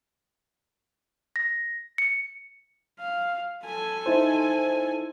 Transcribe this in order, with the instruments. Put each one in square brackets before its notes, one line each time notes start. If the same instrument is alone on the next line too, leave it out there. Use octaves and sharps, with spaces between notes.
[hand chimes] A#6
C#7
[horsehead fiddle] F5
A4 G#5
[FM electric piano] D#4 E4 C5